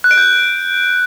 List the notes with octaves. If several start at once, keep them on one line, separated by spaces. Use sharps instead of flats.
F#6
D7
G6